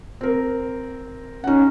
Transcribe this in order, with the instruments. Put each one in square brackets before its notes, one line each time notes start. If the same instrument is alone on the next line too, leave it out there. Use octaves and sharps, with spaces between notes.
[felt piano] C4 A#4
[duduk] C#4 [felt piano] D#4 F#5